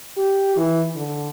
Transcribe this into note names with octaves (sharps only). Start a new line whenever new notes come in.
G4
E3
D3